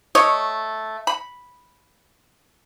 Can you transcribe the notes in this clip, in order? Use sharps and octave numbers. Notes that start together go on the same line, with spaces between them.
A3 C#5 D#5
B5